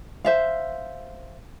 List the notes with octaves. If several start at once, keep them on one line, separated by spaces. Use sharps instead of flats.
C5 E5 F5